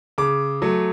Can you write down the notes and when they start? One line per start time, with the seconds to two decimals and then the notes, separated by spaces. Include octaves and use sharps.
0.18 C#3 D6
0.62 F#3 A3